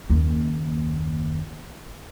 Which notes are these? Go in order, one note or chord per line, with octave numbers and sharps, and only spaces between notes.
F#1 D#2